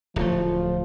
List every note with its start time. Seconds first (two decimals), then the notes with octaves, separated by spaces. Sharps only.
0.16 D1 F3 A3